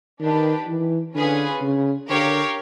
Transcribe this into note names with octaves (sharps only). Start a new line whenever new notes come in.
D#3 D4 G4 B4
E3
D3 C#4 F4 G#4 B4
C#3
D3 G4 A#4 C#5 F5